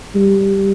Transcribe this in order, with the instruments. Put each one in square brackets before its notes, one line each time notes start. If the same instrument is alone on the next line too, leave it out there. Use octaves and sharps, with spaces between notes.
[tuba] G3